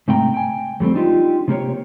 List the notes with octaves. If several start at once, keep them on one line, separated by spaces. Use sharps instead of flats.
G#2 C3 A3 G5 A#5
G5 G#5
F2 G3 A3 C4
D4 D#4 F4 G4
C3 A#3 G4 C#5